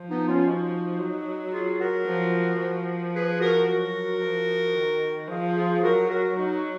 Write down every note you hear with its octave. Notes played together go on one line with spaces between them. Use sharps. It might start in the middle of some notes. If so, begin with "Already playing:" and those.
Already playing: F3
B3 D#4
C#4 F4
D#4 F#4
F#3
F4 G#4
F#4 A#4
F3
F3
G#4 B4
F#4 A#4
F#3 F#4 A#4
F3
D#3
F3 F4 G#4
F4 G#4
F#3 F#4 A#4
F#4 A#4
F#3 D#4 F#4